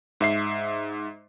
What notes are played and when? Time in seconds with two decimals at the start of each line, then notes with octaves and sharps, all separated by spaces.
0.21 G#2 E5 C7